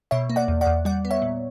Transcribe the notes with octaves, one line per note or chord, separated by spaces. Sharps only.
B2 C#5 E5
A#3
D5 F#5
E2
D5 F#5
E2
G3 D5 F#5
B3
C#5 E5
A#2